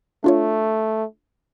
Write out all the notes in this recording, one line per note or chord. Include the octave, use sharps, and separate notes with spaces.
A3 D4 F4 C#5